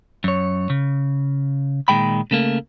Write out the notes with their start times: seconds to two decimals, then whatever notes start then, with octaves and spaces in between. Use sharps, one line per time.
0.24 F#2 C#5
0.70 C#3
1.88 A#2 D#3 G#3 G5 B5
2.31 C#3 A3 A#3